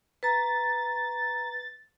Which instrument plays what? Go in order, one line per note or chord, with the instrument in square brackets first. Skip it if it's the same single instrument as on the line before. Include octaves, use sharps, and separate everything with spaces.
[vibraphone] B4 A#5 [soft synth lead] A6